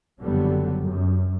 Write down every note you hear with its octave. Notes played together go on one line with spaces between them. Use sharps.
F#1 F2 D3 F#3 G3 B3
F#2